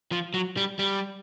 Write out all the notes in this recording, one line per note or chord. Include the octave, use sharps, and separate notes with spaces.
F3
F#3
G3
G3